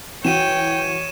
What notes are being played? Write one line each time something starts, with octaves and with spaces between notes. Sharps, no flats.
E3 F#4 C#5 G5 D#7 E7